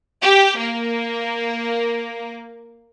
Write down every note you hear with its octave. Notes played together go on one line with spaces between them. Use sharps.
G4
A#3